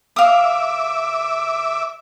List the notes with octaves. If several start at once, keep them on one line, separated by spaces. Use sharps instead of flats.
E5 F5 D6 D#6